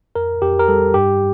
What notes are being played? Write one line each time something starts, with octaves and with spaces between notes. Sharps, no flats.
F2 A#4
F2 G4
A#4
G3 A4
G2 G4